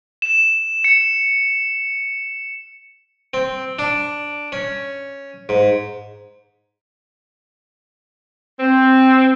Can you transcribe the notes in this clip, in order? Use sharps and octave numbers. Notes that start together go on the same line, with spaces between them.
E7
C#7
C4
D4
C#4
G#2
C4